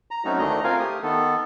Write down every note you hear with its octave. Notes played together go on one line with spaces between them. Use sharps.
A#5
F#3 A3 C4 C#4 D#4 F#4
D2 D#3 A3 D4 D#5 A#5
C4 F4 A#4 F5 G#5
A3 G4 D#6
D#3 B3 A4